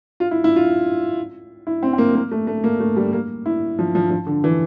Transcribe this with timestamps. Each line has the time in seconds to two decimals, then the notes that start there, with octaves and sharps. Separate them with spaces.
0.20 F4
0.31 E4
0.44 E4
0.56 F4
1.67 E4
1.83 C4
1.93 C4
1.98 A#3
2.15 A#3
2.31 A3
2.47 A3
2.64 A#3
2.80 A3
2.96 G3
3.13 A#3
3.46 E4
3.79 F3
3.95 F3
4.10 F3
4.27 D3
4.44 E3